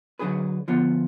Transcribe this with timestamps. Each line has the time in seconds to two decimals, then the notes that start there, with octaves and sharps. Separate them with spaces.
0.19 D3 F#3 D4 G#4 B4
0.68 D3 F3 B3 F4